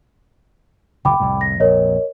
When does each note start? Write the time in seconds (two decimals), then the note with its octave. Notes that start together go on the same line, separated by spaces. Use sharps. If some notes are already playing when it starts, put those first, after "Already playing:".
1.05 F#1 D2 A#2 G5 B5 D6
1.20 C2 F2 A2
1.41 A#6
1.60 A#1 F2 A#4 C#5 D#5